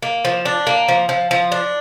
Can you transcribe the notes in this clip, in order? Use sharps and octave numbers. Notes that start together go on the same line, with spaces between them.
A#3
F3
D4
A#3
F3
F3
F3
D4